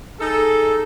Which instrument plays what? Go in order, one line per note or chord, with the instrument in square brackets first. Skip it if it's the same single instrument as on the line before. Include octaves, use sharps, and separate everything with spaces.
[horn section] D#4 G#4 A4